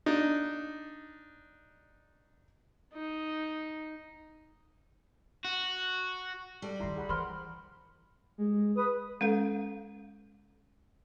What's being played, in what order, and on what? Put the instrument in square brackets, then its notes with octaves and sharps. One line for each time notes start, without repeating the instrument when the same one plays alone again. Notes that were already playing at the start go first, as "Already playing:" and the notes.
[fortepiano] D4 D#4
[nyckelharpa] D#4
[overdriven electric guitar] F#4
[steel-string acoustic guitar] G3 [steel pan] A4
[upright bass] C#2 D#3 [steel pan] E4 A#5 C6
[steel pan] G#4 F#5 B5
[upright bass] E3 [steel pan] A#4 C5 F#5 [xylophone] B5 C6 F6
[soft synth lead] G#3
[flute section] B4 D#6
[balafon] G#3 C#4 A4 F5